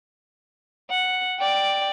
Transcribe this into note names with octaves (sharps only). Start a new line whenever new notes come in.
F#5
D5 G5